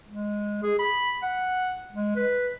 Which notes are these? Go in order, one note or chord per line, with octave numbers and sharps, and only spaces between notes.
G#3
G#4
B5
F#5
G#3
B4